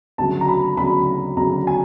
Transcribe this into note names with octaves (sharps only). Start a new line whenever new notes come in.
D2 C#3 F#3 A5
A#5
B5
D2 C#3 F#3 B5
D2 C#3 F#3 A#5
G#5